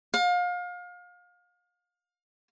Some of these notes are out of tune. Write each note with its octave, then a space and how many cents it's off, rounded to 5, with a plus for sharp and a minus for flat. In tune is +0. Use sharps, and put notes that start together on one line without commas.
F5 +30